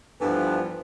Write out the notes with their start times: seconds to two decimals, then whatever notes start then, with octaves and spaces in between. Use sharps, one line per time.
0.21 G2 E3 F3 B3 D4 A4